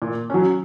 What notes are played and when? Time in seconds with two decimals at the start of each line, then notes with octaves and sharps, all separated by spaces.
0.02 A#2
0.30 F#3 C#4